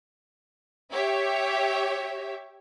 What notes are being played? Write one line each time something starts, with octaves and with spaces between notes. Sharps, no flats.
G4 C#5 E5